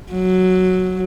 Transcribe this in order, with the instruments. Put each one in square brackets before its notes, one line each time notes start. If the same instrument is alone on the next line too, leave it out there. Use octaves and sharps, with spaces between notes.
[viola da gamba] F#3